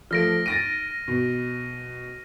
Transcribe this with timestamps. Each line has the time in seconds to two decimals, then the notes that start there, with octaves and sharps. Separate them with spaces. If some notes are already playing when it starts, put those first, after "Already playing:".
0.11 F3 A3 F6 A#6 D7
0.46 A6 A#6 D7 D#7
1.08 B2